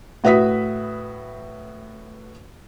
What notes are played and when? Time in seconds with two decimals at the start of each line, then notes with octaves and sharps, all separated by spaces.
0.24 A2 F#4 B4 E5 D#6 B6